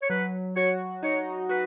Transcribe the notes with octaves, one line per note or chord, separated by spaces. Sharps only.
C#5
F#3 B4
F#4 C#5
D#4 C#5
F#4 B4